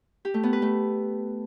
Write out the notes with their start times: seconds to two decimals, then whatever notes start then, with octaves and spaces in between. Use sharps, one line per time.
0.25 G4
0.34 A3
0.43 B3
0.53 B4
0.62 A3